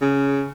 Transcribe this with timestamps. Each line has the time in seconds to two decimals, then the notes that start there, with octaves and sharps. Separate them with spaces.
0.01 C#3